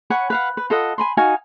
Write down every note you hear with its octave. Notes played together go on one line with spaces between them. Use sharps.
C#5 F#5 G#5 B5
B4 F5 F#5
B4
F4 A4 D#5 F#5
G#5 B5 C6
D#4 F#4 F5 G#5